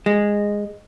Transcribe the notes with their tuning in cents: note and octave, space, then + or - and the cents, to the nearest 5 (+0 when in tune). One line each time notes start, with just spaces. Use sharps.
G#3 -10